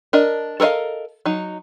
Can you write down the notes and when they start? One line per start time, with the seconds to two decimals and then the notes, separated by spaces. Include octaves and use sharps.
0.13 D4 A#4 D#5
0.60 A4 A#4 C5 D#5 F5
1.26 F#3 D#4